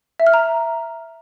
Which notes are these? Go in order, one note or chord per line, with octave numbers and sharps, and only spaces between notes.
E5
F6
A#5